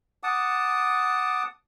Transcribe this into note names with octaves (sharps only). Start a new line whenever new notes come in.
F#5 A5 D6 D#6